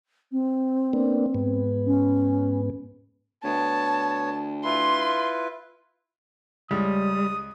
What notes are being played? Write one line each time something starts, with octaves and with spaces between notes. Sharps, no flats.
C4
A#3 B3 D4
G#2 B3
C#4
D2 B3 C#5 A5
E4 F4 B4 C6
C#2 G3 D#6